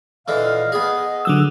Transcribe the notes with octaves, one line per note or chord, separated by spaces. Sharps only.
A#2 D3 E3 D#5 F5
B3 G#4 D#5
D3 F#3 E6